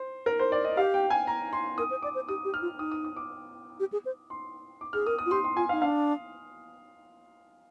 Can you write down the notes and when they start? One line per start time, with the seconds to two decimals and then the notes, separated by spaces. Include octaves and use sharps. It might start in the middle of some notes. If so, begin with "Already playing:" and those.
Already playing: C5
0.26 A#4
0.39 C5
0.52 D5
0.64 D#5
0.77 G4 F5
0.94 G5
1.10 G#5
1.27 A#5
1.53 C6
1.78 A#4 D#6
1.91 C5
2.02 D5 D6
2.15 C5
2.29 G4 D#6
2.45 G4
2.54 F6
2.62 F4
2.78 D#4 D#6
2.91 D#6
3.04 D#6
3.16 D6
3.80 G4
3.93 G#4
4.05 C5
4.30 C6
4.81 D6
4.93 G#4 F6
5.06 A#4 D#6
5.18 D#6
5.26 F4
5.31 G4 C6
5.44 C6
5.56 F4 G#5
5.69 D#4 F5
5.82 D4 F5